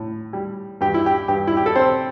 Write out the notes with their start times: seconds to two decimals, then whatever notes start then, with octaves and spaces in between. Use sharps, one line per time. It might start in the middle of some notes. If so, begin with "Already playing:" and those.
Already playing: A2
0.33 G3
0.81 G2 G4
0.94 E4
1.06 G4
1.28 G2 G4
1.47 E4
1.57 G4
1.66 A4
1.76 C4 C5